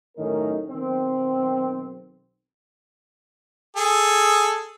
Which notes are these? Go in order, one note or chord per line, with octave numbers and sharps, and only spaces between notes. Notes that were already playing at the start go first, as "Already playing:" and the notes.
F#2 A2 D#3 C#4 D#4 A#4
B1 D#3 C4
G#4 A4